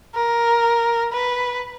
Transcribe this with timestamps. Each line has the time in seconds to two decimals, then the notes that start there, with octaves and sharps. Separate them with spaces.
0.15 A#4
1.13 B4